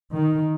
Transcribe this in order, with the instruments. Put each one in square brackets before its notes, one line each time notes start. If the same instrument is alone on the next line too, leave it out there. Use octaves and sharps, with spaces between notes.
[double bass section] D#3